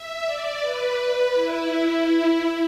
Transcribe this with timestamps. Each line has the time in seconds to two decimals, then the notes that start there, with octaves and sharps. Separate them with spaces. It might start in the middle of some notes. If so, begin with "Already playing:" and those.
Already playing: E5
0.24 D5
0.61 B4
1.34 E4